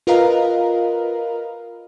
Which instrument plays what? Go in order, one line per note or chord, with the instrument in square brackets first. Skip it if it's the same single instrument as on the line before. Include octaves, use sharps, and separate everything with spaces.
[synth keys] F4 A#4 B4 D#5 F5 A#5